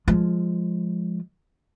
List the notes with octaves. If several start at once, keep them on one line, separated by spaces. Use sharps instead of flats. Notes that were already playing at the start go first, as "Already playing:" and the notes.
F3 G#3